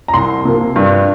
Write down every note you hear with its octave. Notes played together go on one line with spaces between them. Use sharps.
A#5
C2 C6
C3 F3 A#3
G2